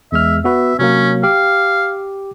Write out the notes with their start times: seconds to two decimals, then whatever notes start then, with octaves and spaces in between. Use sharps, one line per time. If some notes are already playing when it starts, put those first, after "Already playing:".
0.12 E2 G#3 E5 F6
0.44 B3 F#4 B4 E5
0.79 C3 F#3 A#3 C#4
1.23 G4 F5 D6